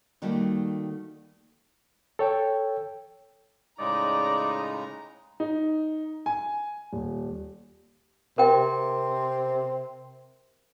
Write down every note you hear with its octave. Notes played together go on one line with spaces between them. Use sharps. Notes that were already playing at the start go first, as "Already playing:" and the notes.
D#3 G3 A3 A#3 F#4 G4
A4 C#5 G5
A2 C#3 G#3 D#4 D5 A#5
D#4
G#5
D#1
C3 C4 A#4 G5